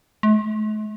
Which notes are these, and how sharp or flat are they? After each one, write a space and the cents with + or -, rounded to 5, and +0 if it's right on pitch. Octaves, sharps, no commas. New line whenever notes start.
A3 -45